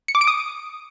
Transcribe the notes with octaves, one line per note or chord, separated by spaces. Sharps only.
C#7
D6
D7
D#6